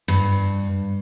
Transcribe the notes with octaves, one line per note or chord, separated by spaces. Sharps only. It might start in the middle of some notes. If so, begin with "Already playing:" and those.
G2